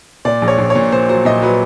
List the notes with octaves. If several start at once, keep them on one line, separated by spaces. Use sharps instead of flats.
A#2 D5
A#1
C#5
A#1
C#5
A#2
A#2 C5
F#3 C5
A#2 D#5
F#3 B4